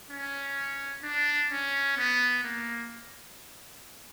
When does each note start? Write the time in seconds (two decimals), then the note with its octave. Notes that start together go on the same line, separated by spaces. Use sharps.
0.10 C#4
1.03 D4
1.51 C#4
1.98 B3
2.44 A#3